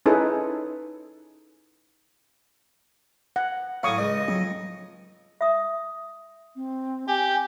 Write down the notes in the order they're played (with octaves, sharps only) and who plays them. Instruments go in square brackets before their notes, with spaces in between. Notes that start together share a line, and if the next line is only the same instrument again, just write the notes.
[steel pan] C#4 D#4 E4 G#4 A4 B4
F#5
[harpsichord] A2 F#3 [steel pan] F5 C#6 D#6
[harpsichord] C#2 [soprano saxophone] D#5
[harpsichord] F2 [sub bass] F#3
[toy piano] E5 D#6
[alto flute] C4
[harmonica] G4 [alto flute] G#5